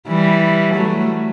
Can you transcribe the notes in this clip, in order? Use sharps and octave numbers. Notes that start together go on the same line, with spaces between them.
E3 G3
F#3 A3